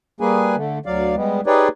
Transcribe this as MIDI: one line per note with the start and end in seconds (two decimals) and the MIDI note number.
0.20 0.56 55
0.20 0.56 58
0.20 0.56 68
0.20 0.56 71
0.20 0.56 80
0.56 0.79 50
0.56 0.79 57
0.86 1.15 38
0.86 1.15 54
0.86 1.15 74
0.86 1.15 77
1.15 1.41 55
1.15 1.41 56
1.15 1.41 59
1.46 1.68 63
1.46 1.68 67
1.46 1.68 68
1.46 1.68 71
1.46 1.68 73
1.46 1.68 74